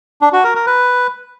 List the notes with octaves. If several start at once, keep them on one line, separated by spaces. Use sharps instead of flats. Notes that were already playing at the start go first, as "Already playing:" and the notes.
D4
F#4
A#4
A#4
B4